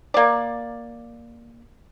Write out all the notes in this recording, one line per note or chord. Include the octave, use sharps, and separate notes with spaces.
A#3 D5